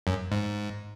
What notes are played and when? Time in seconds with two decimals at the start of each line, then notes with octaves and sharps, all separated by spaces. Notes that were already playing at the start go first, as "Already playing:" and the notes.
0.07 F#2
0.32 G#2